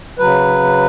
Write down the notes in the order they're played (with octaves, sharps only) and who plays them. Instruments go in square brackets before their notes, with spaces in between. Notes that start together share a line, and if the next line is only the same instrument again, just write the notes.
[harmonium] C#3 F#3 B4